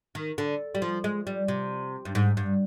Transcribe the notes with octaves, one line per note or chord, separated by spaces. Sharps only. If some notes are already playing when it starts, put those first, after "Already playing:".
D#3
D3
G3
F3
G#3
G3
C3
G2
G#2
G2